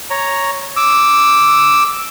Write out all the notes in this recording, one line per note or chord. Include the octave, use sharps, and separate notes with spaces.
C#5 A#5
D6 E6